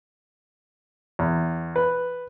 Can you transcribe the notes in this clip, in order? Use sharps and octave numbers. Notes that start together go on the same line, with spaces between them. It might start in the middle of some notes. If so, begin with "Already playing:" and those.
E2
B4